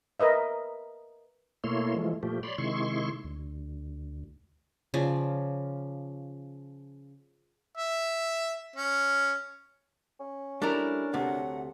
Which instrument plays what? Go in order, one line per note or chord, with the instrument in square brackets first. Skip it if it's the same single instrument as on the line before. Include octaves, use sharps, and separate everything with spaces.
[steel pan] A#4 B4 D#5 E5
[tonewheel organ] B2 A3 A#3 E4 C#5 C6
E3 F3 G#3 A3
A#2 F3 A3 G4
C#5 D5 B5 C6
C3 D#3 G#3 E4 C6 C#6
D2
[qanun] C#3 F3 D5
[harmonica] E5
C#4
[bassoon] C#4
[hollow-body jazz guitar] G3 A3 E4 [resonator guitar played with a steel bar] D4 A#4
[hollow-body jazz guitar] D2 C3 A3 [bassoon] F#3 [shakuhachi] F#5